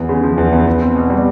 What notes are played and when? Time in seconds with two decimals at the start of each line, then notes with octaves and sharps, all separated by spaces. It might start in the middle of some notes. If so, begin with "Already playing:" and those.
Already playing: E2
0.09 C#3
0.23 F3
0.38 E2
0.52 E2
0.67 E2
0.81 C4
0.95 B2
1.10 G3